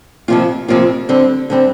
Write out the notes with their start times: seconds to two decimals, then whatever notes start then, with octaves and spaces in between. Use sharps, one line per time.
0.28 F2 C3 F3 A#3 F4
0.68 F2 C3 F3 A#3 F4
1.09 D3 G3 C4
1.50 D3 G3 C4